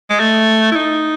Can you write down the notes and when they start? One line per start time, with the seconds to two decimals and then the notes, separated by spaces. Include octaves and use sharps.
0.10 G#3
0.20 A3
0.72 E4
0.76 D#4